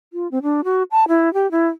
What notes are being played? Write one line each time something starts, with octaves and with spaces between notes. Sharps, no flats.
F4
C4
D4
F#4
A5
E4
G4
E4